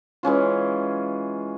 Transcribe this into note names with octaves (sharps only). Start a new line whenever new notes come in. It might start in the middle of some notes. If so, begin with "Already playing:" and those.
E3 G#3 C#4 F4